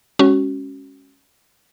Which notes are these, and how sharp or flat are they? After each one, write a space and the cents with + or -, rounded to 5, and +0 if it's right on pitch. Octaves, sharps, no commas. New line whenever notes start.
G#3 -20 C#4 -5 F#4 +25